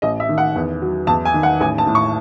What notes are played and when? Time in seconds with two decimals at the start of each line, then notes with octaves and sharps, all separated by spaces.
0.02 A1 D#5
0.20 E5
0.29 D#3
0.38 F#5
0.56 E2
0.82 F#3
1.07 E2 A5
1.25 G#5
1.34 D#3
1.43 F#5
1.60 A1 G#5
1.78 A5
1.87 A2
1.95 C#6